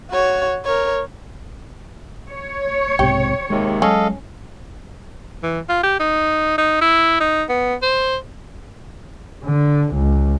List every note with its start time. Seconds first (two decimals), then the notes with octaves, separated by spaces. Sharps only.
0.11 F#4 C#5
0.65 A#4 C#5
2.29 C#5
2.99 B1 G#2 C3 G4
3.50 D#2 C3 D#3 G#3
3.82 F#3 G#3 C#4 A4 D#5 F5
5.43 E3
5.69 F4
5.83 G4
5.99 D#4
6.58 D#4
6.81 E4
7.20 D#4
7.49 B3
7.82 C5
9.44 D3
9.93 C#2